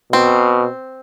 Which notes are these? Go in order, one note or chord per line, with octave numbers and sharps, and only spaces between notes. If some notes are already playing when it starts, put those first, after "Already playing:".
B2 C4